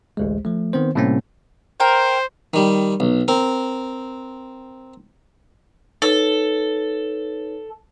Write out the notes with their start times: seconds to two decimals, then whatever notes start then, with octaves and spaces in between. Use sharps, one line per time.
0.17 A1 D2 G#3
0.45 F3 A3
0.73 D#3 B3 C4 C5
0.95 A2 C3 G3 A#3 C4 C#4
1.80 A#4 C5 G5
2.54 D#3 G3
3.00 B1
3.28 C4 A#4
6.02 D#4 A4 B4 C#5